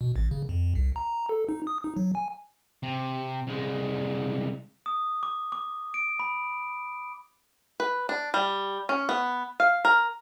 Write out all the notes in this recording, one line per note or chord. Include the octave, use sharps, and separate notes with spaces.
B2
A1
C#3
F2
C2
A#5
A4
D#4
D#6
D#4
F#3
G#5
C3
C2 G#3
D#6
D6
D6
D7
B5
B4
D4
G3
C#4
B3
F5
A#4